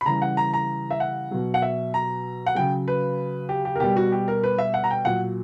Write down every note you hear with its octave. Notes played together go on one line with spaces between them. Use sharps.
B5
C#3 E3 G3 A#5
F#5
A#5
A#5
E5
F#5
B2 F#3
F#5
E5
A#5
F#5
C#3 F#3 G5
B4
G4
G4
A#4
B2 G3 G4
F#4
G4
A#4
B4
E5
F#5
A#5
G5
A#2 F#3 F#5